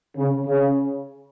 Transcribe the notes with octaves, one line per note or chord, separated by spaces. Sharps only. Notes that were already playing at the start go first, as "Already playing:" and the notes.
C#3
C#3